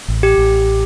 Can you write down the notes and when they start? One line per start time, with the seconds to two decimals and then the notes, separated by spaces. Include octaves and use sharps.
0.08 A1
0.23 G4
0.38 A1